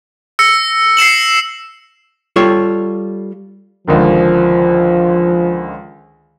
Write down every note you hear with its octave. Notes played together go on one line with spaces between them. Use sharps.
E6 A#6 C#7
C7 C#7 E7 F#7
G3 F4 A4 C#5
C#2 D3 D#3 F3